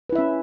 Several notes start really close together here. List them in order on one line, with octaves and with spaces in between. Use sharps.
B4 E4 E5 C#4